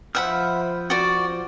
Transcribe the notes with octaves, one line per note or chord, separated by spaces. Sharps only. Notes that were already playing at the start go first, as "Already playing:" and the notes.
F3 C5 E5 F#5 B5 F6
F#4 D5